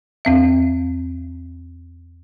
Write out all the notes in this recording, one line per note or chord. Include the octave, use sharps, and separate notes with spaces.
E2 C4 E5